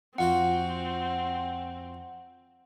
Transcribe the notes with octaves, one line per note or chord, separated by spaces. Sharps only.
F2 C4 F4 F#4 F#5